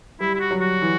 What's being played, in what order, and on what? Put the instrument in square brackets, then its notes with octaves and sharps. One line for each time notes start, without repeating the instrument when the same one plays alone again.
[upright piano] G3 [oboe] E4
[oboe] E4
F#4
[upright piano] F#3
[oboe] F#4
[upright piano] E3